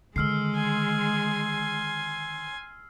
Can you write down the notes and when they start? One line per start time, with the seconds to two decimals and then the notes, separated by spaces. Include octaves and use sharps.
0.16 D3 D#3 G#3 E6 F6 C7
0.55 G#5 C6